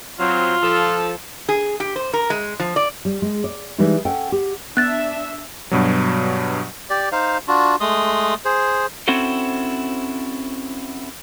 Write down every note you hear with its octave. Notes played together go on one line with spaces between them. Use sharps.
F#3 C4 F4
F3 A4
G#4
G4
C5
A#4
G#3
F3
D5
G3
G#3
D5
E3 G3 G#3 D#4
C#4 A4 F#5 G5
G4
B3 D4 E5 F#6 A6
G2 B2 F#3
G4 D5
D#4 C5 F5
D4 F4 F#4
G#3 A3 C6 D#6
G#4 C5
C4 C#4 E4 F#4 A4 C5